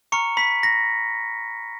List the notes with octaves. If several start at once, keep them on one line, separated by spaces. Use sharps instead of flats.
A#5 C#6 F6 C#7
B5 B6
A#6